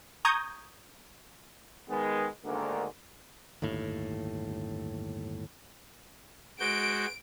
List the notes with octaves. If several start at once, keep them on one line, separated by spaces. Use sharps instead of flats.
A#5 C#6 D#6 G6 G#6
D#3 G#3 B3
D2 G#2 D3 D#3 G#3 A#3
G1 D#2 A2
G#3 F#4 G6 D7